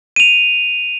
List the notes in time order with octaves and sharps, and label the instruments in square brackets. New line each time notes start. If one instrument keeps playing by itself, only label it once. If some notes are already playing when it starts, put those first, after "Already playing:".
[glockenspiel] D#7 F7